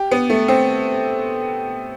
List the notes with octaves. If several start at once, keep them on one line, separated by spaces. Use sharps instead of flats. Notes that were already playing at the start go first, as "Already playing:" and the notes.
Already playing: G4
B3
A3
C4